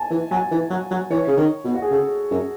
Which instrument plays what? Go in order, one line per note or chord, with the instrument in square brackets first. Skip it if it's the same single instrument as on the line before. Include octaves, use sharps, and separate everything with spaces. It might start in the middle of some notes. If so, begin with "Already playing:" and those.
Already playing: [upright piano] G#5 A5
[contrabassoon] E3
[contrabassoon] F#3 [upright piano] G#5
[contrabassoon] E3
F#3
F#3
[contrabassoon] E3 [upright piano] C#5
[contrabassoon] C#3
D#3
B2
[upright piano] F#4
G#4
[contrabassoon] C#3 [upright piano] A4
[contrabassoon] F#2